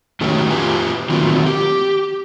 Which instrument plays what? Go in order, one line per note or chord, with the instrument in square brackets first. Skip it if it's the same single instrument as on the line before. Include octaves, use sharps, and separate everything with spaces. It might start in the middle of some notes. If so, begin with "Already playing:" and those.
[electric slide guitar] D#3 F#3 A3 C#4 G4
F4 G4 B4 G#5
D#3 F#3 A3 A#3 C4 F4
G4